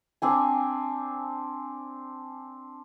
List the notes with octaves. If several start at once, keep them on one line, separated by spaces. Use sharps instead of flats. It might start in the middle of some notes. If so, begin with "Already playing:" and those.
C4 D4 G#5